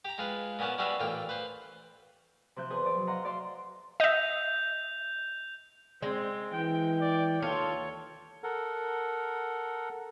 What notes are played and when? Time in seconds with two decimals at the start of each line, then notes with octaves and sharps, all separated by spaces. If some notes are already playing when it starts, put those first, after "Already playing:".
0.05 G4 A#5
0.18 G#3 F4 B4
0.59 A#2 B3 C#4 F#5 A5
0.78 G3 C#4 D4 F#4 B4 E5
0.99 A1 A#2 F4 G5
1.29 B4 C5
2.56 C3 F3 E4 E5 F#6 G6
2.70 E2 G#4 B4 C6 D#6
2.82 F3 D5
2.95 F#3
3.07 D#5 F5 F#5 A#5 C6
3.25 D5 E5 F5 C6 D6
4.00 D#5 E5 G6 F7
6.02 G#3 C4
6.53 E3 G5
7.01 D5
7.42 D#2 F4 A4 C#5
8.43 A4 A#4 F#5